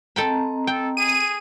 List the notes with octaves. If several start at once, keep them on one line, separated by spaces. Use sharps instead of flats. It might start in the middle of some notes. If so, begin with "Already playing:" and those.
C4 A4 D#5 G5 A#5 B5
A4 G5
G#4 D#7